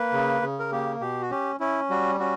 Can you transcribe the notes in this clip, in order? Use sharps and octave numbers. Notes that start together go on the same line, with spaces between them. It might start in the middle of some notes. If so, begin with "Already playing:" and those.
Already playing: A#3 B4
C#3
C#3
A#4
A#3 G4
B2 G4
F#4
C#4 G4
C#4 E4
G3 F#4
C#4 F#4